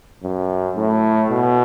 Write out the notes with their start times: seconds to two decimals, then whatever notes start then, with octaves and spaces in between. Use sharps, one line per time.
0.23 F#2
0.76 A2
1.30 B2